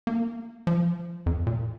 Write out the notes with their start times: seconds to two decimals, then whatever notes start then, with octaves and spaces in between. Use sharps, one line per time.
0.07 A#3
0.67 F3
1.26 F2
1.47 A#2